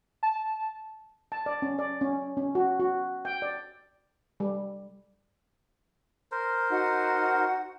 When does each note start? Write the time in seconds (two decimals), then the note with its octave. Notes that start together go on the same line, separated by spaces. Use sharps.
0.23 A5
1.32 A5
1.46 D5
1.62 C#4
1.79 D5
2.01 C#4
2.37 C#4
2.55 F#4
2.80 F#4
3.25 G5
3.42 D5
4.40 G3
6.32 A#4 C5
6.70 D#4 F#4 F#5